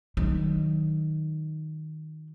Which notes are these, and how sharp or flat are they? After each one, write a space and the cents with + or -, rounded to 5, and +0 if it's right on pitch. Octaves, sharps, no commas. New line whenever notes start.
D#3 +0 F#3 +0